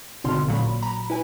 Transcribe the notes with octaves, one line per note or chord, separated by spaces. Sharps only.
G#1 B2 D3 C6 F6
A1 A#2 F#3 B5
A#5 B5
E4 B4 G#5